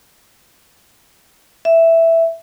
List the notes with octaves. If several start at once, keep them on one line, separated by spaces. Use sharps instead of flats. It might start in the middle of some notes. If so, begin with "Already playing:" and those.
E5